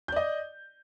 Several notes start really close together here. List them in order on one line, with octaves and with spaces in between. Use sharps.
G6 D5 D#5